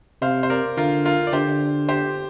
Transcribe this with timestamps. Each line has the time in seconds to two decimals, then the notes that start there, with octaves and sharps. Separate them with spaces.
0.22 C3 C5 F5
0.43 C5
0.50 A#4 D5
0.78 D3 F4 A#4
1.05 F4 A#4
1.27 D5
1.33 D3 G4 C5
1.89 G4 C5